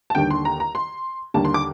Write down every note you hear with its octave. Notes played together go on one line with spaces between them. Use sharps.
A5
D#2 D3 G3 G5
C6
A#5
A#5
C6
D#2 D3 G3 A#3 A5
C6
D6